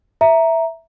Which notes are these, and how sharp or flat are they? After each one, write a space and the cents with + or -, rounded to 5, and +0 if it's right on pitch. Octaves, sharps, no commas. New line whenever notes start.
E5 +0 A#5 +0